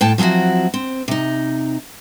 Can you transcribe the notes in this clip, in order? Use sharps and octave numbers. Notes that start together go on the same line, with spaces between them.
A2 G5 A5
F3 F#3 C4 E4 F#4
C4
C3 D#4